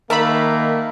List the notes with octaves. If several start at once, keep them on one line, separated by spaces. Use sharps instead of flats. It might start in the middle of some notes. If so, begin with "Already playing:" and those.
D#3 A3 A#3 A#4 E5 F5 B5